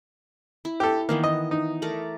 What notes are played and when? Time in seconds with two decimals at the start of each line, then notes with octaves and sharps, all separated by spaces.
0.65 E4
0.80 G4 A4
1.09 D#3 E3 A#3 B3
1.24 D#5
1.51 D#4
1.82 A3 A#4 D5